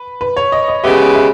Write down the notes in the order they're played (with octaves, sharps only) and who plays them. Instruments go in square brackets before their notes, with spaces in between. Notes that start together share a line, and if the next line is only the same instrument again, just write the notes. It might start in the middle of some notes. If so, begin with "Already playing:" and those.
Already playing: [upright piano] B4
B4
C#5
D#5
D#5
[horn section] C#3 G#3 B3 G4 B4 [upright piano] E5
[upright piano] E5